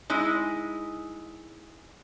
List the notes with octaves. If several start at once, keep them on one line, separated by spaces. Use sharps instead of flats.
G#3 D#4 E4